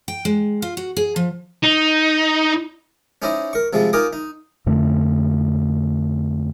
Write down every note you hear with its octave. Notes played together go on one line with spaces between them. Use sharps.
G5
G#3
F4
F#4
G#4
F3
D#4
C#4 D#4 E4 C5 D5 D#5
A#4 C#6
C3 F3 G3 G#3
D#4 F4 A#4 G#5 D6 D#6
D#4
F2 D3 A3